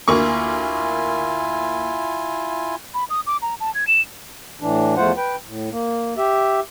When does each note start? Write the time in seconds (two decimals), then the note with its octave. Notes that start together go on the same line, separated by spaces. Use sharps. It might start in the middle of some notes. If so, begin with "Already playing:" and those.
0.08 D2 A#3 E4 F4 G#5 C#6
2.94 B5
3.10 D#6
3.27 D6
3.42 A#5
3.60 A5
3.75 G#6
3.87 E7
4.61 A2 E3 D4
4.97 E2 F3 A3 F4 C5 F#5
5.17 B4 G5
5.46 A2
5.72 A#3
6.17 G4 E5